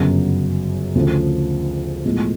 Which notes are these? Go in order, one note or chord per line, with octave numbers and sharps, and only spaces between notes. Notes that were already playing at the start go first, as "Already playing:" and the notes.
Already playing: G1 F#2 C#3 F#3
D2 C#3 F3
B1 A2 F3 G#3